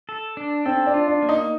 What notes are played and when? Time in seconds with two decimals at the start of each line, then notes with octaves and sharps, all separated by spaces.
0.09 A4
0.37 D4
0.65 C4 A4
0.87 D4
0.94 F4
1.08 D4
1.23 A#3
1.29 D#4